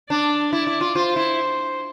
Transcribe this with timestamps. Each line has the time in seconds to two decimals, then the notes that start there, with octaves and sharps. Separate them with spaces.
0.10 D4 D5
0.52 E4 D5
0.67 E4
0.81 F4
0.95 F4 C5
1.16 E4